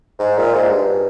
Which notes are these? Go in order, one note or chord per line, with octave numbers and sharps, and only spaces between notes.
G#2
A#2
G#2
G2